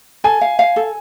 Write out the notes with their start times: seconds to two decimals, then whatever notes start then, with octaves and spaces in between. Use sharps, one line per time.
0.24 A4 G#5
0.41 F5
0.59 F5
0.76 A4